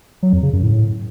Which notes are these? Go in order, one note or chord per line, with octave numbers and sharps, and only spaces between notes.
F#3
F2
C#3
F#2
A2